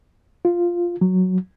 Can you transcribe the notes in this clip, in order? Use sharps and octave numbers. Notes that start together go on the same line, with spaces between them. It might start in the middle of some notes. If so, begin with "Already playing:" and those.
F4
F#3